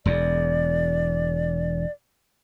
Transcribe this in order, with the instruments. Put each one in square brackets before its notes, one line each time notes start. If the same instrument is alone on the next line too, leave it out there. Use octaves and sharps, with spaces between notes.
[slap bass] E1 E2 [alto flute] D5